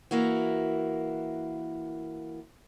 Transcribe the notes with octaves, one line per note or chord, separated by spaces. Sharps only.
E3 A#3 E4 F#4